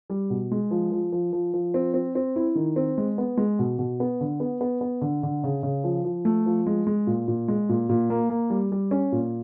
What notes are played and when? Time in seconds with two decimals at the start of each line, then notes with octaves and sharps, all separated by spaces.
0.10 G3
0.30 B2
0.51 G#3
0.71 F3
0.92 F3
1.12 F3
1.33 F3
1.54 F3
1.74 C4
1.94 C4
2.15 C4
2.36 E4
2.55 D#3
2.76 C4
2.98 G#3
3.18 B3
3.37 G#3
3.59 B2
3.79 B2
4.00 B3
4.21 D3
4.40 B3
4.61 B3
4.81 B3
5.01 D3
5.23 D3
5.44 C#3
5.63 C#3
5.84 F3
6.05 F3
6.25 A3
6.46 F3
6.66 G#3
6.87 G#3
7.07 A#2
7.28 A#2
7.48 G#3
7.69 A#2
7.89 A#2
8.10 A#3
8.30 A#3
8.50 G3
8.72 G3
8.91 C#4
9.12 A#2